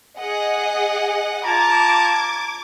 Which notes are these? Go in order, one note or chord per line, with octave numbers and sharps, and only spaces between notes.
G#4 D#5 F#5
F4 A5 A#5 D6 G#6